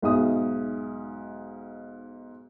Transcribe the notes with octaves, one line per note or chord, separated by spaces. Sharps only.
B1 G#2 E5 D#6